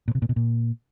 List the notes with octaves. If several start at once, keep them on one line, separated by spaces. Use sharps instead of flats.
A#2
C3
A#2
B2
A#2